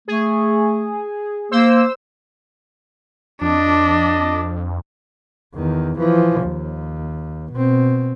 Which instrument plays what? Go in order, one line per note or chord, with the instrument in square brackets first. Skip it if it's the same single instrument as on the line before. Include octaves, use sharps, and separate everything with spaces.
[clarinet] A3 [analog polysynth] G#4
[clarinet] A#3 [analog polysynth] C5 E6
[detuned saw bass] F2 [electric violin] D4 [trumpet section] D#5 A5 D6
[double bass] E2 D#3
E3 F3
D#2
B2 C4